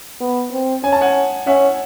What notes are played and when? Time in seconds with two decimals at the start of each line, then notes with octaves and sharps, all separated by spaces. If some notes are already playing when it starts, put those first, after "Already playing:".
0.20 B3
0.52 C4
0.84 C#4 G#5
0.93 A5
1.01 F#5 G#5
1.47 C#4 E5 F#5